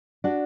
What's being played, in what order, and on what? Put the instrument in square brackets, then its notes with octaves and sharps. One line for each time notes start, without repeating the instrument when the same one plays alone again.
[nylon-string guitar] D4 F#4